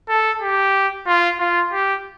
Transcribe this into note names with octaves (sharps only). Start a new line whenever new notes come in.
A4
G4
F4
F4
G4